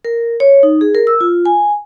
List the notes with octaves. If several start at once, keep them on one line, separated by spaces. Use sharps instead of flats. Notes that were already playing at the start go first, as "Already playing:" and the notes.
A#4
C#5
D#4
G#4
A#4
E6
F4
G#5